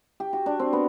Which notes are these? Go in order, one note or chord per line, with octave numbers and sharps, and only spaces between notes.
G4
F#4
D4
C4
B3